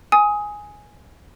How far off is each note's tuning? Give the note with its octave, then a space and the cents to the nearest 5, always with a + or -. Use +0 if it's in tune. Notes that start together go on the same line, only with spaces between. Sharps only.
G#5 +0 D#6 +20